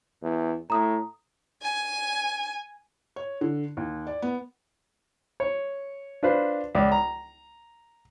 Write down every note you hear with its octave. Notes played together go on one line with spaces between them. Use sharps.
E2
A2 A#5 D#6
G#5
C#5
D3
D#2
D5
B3
C#5
D4 F4 B4 C5
C#2 D5
A#5